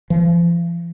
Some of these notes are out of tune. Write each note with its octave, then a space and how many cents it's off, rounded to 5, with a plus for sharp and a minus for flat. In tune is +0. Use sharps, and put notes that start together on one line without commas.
F3 -45